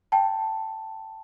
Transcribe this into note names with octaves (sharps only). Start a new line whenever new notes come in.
G5 A5